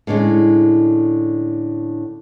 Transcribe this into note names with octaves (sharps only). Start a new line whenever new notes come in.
A2 D3 G#3 C#4